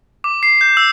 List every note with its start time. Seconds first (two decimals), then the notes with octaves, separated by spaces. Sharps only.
0.24 D6
0.43 C7
0.61 G6
0.77 E6